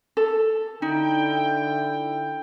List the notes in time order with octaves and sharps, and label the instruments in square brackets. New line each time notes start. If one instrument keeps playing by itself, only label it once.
[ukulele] A4
[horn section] D3 E4 G5 [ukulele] D#4